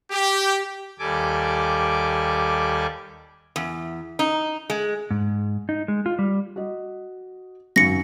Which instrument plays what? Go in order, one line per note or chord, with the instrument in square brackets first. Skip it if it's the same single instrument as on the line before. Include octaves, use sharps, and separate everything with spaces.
[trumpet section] G4
[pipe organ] D#2 G3 A4 G#5 D6
[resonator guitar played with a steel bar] E2
D#4
G#3
[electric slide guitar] G#2
D#4
G#3
F4
G3
[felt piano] F#4 D#5
[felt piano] G#1 F#2 F#3 [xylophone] A#6 C#7